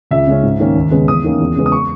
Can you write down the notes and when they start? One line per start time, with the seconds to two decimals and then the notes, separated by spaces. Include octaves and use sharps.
0.11 C#2 E5
0.27 C#3 G#3 C#4
0.43 G#2
0.59 D#3 A#3 C#4
0.76 D#2
0.91 C#3 G#3 B3
1.08 E2 D#6
1.24 D#3 A#3 C#4
1.40 E2
1.56 C#3 G#3 B3
1.66 D#6
1.72 C#6